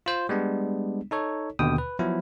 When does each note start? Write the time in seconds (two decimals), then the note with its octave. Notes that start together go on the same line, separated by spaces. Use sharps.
0.06 F4 C5
0.29 G3 G#3 B3 D4
1.11 D#4 A4 C#5
1.59 D#2 B2 D3 G5 D#6
1.78 B4
1.99 F3 F#3 B3 E4